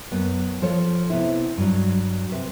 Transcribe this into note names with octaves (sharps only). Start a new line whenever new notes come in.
F#2 B3
F3 A4 C#5
C3 B3 E4
G2 F#3
C3 B4